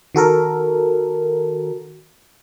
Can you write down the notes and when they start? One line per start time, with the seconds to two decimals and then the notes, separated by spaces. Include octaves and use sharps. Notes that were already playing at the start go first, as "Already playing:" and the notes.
0.15 D#3 F#4 A4 A#4